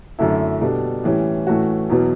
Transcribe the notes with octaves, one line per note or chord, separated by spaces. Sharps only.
F#2 D3 A3 E4
B2 G3 D4 A4
A2 E3 G3 C#4
A2 E3 A3 C#4 F#4
E2 B2 F#3